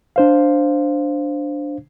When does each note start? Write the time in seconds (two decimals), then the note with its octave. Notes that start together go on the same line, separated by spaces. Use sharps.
0.16 D4 C5 F5